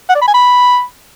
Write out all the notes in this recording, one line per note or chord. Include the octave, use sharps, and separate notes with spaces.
F#5
D5
B5
G#5
B5